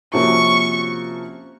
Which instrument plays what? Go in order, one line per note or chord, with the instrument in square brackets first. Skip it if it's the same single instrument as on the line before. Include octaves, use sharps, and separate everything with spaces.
[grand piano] C3 F3 A#3 C#4 F#4 [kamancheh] C#6